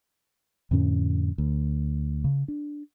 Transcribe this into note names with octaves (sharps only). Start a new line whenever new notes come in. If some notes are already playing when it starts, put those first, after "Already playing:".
F2 A2 D3 C#4
D2
C#3
D4